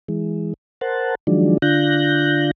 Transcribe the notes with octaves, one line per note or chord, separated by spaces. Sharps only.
E3 G#3
A#4 C5 F#5 A5
D#3 F3 F#3 G#3 D4
D3 D4 F4 F#6 G6 A#6